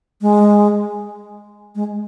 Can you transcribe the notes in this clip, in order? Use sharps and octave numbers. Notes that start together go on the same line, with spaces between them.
G#3
G#3